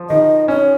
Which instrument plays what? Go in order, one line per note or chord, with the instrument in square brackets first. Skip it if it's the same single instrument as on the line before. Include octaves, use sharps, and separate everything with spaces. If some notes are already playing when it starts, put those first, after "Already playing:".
Already playing: [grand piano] F3
[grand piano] D#3 [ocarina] D#5
[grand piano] C#4 [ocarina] C#5